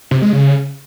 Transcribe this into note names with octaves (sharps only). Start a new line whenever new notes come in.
C3
G#3
C#3